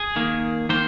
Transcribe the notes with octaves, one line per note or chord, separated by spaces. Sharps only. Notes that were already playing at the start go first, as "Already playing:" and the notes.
Already playing: G#4
D#3 A#3
D#3 A#3 C5